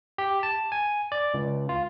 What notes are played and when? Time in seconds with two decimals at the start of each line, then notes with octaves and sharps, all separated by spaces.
0.18 G4
0.43 A5
0.72 G#5
1.12 D5
1.34 C#2
1.69 F4